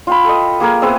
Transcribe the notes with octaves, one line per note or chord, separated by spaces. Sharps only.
F4 G5 B5
A4 D#5
A#3 G#4 A#4 G#5
B3 C4 G#4 E5